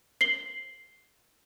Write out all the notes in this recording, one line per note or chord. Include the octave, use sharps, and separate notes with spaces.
C7 F#7 G7